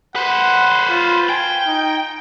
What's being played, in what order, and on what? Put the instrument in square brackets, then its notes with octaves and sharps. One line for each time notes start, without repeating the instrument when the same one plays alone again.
[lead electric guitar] B4 C5 [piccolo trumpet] F#5
[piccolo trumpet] F4
[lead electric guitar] G5 [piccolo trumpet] G#5
[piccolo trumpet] D#4